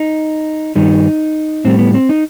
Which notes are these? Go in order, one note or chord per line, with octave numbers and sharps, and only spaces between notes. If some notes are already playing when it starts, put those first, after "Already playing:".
Already playing: D#4
G2 D#3 G3 D#4
A2 G3 C4
B3
C4
D#4